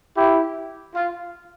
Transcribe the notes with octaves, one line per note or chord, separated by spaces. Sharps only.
E4 G4
F4